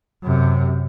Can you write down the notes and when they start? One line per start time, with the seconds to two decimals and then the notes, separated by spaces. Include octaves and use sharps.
0.23 F#2 C3